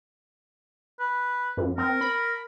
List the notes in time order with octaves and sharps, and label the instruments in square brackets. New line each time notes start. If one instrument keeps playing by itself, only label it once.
[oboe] B4
[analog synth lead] F#2
[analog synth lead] C4 [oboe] A#4
[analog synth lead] B5